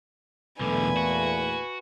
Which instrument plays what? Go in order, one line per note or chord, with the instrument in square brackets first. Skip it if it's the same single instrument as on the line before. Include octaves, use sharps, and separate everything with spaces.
[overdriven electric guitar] B1 D3 [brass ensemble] E2 A#2 A3 [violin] B4 G#5
[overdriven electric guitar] F#4